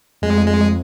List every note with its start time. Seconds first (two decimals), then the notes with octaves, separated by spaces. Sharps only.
0.22 F2 G#3
0.46 G#3